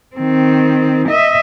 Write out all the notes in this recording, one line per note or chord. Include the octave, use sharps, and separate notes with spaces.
D#3 C4
D#5 E5